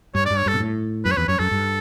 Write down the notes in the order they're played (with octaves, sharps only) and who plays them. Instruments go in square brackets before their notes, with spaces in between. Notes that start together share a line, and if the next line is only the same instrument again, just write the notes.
[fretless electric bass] G2 [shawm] C#5
[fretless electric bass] G2 [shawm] D5
[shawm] C#5
[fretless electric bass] G2 [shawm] A4
[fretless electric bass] B2
A2
[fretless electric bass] F#2 [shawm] B4
[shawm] C#5
[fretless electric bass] E2 [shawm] B4
[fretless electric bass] F#2 [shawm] C#5
[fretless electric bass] F#2 [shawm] A4
[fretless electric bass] G2